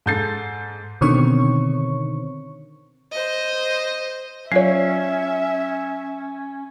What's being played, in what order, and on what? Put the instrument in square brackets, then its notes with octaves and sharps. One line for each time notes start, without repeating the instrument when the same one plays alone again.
[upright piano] G#2 A4 G6 A6 C7
[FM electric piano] B2 D3 D#3 C4 C#5 C#6
[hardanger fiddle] C5 D#5
[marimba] F#3 F4 D5 [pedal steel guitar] C#4 [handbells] C#5 C7 [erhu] E5